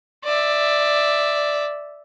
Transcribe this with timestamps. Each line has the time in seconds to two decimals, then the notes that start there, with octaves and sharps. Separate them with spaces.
0.25 D5 E5